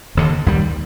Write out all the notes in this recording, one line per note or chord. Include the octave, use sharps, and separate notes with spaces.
E1 D#2 D3
D#2 D#3 G3